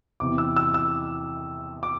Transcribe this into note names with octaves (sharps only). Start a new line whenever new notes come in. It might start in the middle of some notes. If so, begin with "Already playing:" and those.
E2 C3 E3 D6
E6
E6
E6
D6